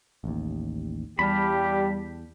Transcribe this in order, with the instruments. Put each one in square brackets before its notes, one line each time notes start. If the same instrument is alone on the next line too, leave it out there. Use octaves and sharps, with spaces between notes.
[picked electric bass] A1 D#2
[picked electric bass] E2 [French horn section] G3 [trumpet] G4 [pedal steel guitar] F5 A5 B5